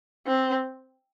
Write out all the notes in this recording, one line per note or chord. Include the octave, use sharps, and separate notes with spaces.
C4